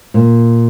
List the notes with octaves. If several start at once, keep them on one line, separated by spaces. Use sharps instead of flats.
A#2